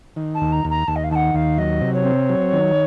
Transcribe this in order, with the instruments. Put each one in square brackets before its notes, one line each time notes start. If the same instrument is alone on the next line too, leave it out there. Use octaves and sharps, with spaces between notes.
[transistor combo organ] D#3
[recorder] A5
[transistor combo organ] D#2
[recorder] A#5
[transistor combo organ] D#2
[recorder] A#5
[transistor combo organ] D#2 [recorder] A5
[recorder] D#5
F5
[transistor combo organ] D#3 [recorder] F#5 A5
[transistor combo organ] D#2 [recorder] F5
[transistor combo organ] F#3 [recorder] D#5
[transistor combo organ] C3
[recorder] C#5
[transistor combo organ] C4
F#3
D#3